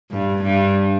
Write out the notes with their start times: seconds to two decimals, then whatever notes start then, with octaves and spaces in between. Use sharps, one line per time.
0.11 G2
0.43 G2